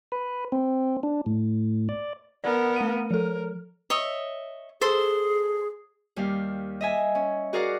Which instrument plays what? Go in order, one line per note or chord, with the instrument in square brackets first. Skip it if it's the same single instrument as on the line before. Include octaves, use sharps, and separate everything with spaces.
[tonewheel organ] B4
C4
D4
A2
D5
[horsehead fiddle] B3 A#4 [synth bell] D5
[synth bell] A3 F5 D#7
[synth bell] F3 A4 [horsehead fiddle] A#4
[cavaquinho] C#5 D#5 E5
[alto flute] G#4 [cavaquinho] A4 C5 C6
[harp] D#2 G3 G4 F5
D#5 E5 G#5
C#4
F#4 G#4 A#4 D5 F5 F#5